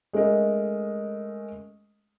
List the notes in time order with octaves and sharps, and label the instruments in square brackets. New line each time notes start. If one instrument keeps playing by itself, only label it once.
[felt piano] G#3 A3 C#4 A#4 D#5